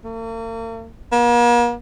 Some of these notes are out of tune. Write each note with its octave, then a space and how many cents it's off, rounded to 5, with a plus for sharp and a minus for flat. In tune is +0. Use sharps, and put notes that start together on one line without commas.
A#3 -45
A#3 +45